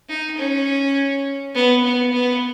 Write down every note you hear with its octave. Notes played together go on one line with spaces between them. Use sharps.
D#4
C#4
B3
B3
B3